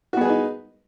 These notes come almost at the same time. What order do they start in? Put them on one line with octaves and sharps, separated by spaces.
F#4 B3 G#4 B4 D#4